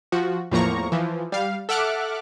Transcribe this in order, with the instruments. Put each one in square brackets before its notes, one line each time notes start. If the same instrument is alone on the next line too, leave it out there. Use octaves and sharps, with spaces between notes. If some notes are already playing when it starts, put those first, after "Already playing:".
[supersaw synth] F3 F#4
E2 A2 F3 A#3 A#5 C#6
E3 F3
G3 F5
A4 E5 F#5 D6 F6 F#6